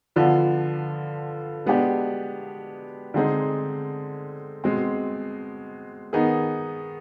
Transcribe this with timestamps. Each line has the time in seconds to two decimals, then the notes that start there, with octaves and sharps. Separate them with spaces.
0.16 D3 F3 B3 D4 F4
1.65 B2 G#3 B3 D4 G4
3.14 D3 G#3 C4 D#4 G#4
4.64 B2 G#3 C4
6.13 D#3 B3 D#4 G#4